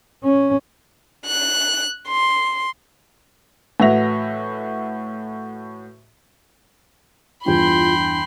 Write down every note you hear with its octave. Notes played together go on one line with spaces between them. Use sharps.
C#4
F#6
C6
A2 E3 F#4 E5 A#6 F7
E2 G2 F4 G5 B5 C6